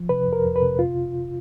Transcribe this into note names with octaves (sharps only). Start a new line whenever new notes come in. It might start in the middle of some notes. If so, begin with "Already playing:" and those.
Already playing: F3
C3 B4
F2
A#4
F2
B4
C3
F4